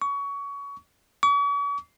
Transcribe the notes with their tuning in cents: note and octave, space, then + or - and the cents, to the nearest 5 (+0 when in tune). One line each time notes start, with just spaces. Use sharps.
C#6 +25
C#6 +45